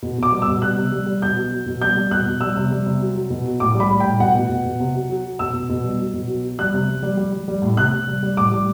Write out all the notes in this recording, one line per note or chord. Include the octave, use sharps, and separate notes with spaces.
B2
B2 D6
G3
E6
B2
G3 F#6
C3
G3
G3
B2 G6
F#3
F#3
B2
G3 G6
G3
B2 F#6
B2
G3 E6
C3
G3
C3
F#3
F#3
B2
F#3
A2 D6
G3
B5
G3
A2 G5
B2 F#5
B2
B2
B2
C3
F#3
F#3
F#3
B2 E6
B2
B2
G3
F#3
B2
F#3
F#3
G3 F#6
C3
G3
G3
G3
G3
G3
A2
C3 F#6
C3
G3
G3
A2 D6
G3